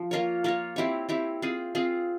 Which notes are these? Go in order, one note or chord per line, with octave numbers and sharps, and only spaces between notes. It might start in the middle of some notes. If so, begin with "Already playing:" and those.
Already playing: F3
A#3 F4 A#4 C#5
A#3 F4 A#4 C#5
C4 E4 G4 C#5
C4 E4 G4 C#5
C4 F4 G#4
C4 F4 G#4